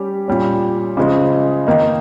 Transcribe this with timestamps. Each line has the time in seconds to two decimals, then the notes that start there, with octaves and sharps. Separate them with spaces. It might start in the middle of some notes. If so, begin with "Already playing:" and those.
Already playing: G3 C#4 G4
0.28 A#2 G3 C#4
0.97 C#3 F3 G#3
1.67 D#3 A#3 D#4